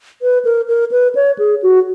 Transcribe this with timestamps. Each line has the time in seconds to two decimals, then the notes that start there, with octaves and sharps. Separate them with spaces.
0.22 B4
0.45 A#4
0.68 A#4
0.91 B4
1.15 C#5
1.38 G#4
1.63 F#4